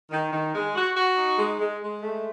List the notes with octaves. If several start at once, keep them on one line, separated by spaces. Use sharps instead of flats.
D#3
D#3
G#3
F#4
F#4
D#4
G#3
G#3
G#3
A3